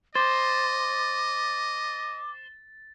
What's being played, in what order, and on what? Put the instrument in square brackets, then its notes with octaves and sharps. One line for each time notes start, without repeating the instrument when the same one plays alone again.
[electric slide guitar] C5 [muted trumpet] D#5 [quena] D6 [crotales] A6